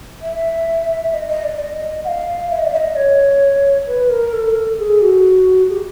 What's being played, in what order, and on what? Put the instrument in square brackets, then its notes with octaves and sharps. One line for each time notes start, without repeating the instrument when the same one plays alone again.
[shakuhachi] E5
D#5
D#5
D5
D#5
F#5
F5
E5
D#5
D5
E5
D#5
C#5
B4
A#4
A4
G#4
F#4
G#4
G4